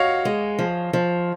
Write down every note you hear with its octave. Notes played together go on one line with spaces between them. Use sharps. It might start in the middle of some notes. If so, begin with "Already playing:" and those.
Already playing: F#4 C#5 D#5 F5
G#3
F3
F3